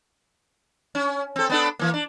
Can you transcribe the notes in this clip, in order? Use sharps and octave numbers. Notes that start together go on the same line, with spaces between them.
C#4
C4 A4
B3 D4 A4
E3 A#3
D4